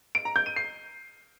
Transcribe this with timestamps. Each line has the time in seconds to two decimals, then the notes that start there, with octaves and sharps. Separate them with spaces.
0.15 D7
0.25 A#5
0.36 G6
0.46 D#7
0.56 C7